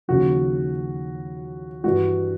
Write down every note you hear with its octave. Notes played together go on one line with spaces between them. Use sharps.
D#2 C#3 F3 F#4
G2 E3 G3 F#4